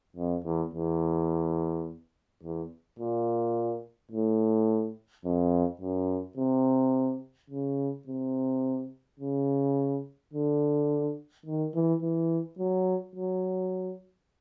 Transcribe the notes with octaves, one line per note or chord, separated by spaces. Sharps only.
F2
E2
E2
E2
A#2
A2
F2
F#2
C3
C#3
C3
C#3
D3
D#3
E3
E3
F#3
F#3